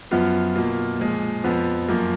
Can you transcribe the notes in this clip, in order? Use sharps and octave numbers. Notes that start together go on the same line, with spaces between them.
F#2 F3 B3 F4
B2 A#3 F4
A#2 F3 G#3
F2 F3 B3
F#2 F3 A#3 F4